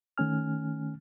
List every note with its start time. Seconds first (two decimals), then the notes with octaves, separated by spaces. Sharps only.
0.18 D#3 A3 C#4 G#5 F6